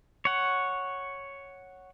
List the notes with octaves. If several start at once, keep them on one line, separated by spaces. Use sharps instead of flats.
C#5 F#5